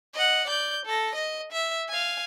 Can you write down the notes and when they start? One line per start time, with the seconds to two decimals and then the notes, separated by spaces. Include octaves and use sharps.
0.15 D#5 F#5
0.47 D5 G6
0.85 A4 A#6
1.15 D#5
1.52 E5
1.89 F5 G#5